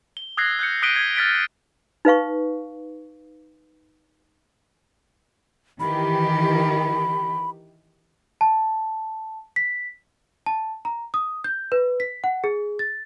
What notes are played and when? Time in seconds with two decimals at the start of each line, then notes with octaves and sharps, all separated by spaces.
0.17 G7
0.37 D#6 E6 F#6 G#6 A#6 C7
0.59 F#6 G6 C#7
0.82 D#6 F#6 B6 D7 D#7 G7
0.96 G#6
1.16 F6 A6 B6 D7
2.05 D#4 B4 F5 C#6
5.80 D#3 E3 G4 B5
8.41 A5
9.56 B6
10.46 A5
10.85 A#5
11.14 D#6
11.44 G6
11.72 B4
12.00 B6
12.24 F#5
12.44 G#4
12.79 A6